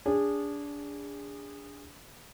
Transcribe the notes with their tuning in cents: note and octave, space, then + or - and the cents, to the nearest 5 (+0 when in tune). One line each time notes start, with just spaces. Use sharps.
D4 -25 G#4 -25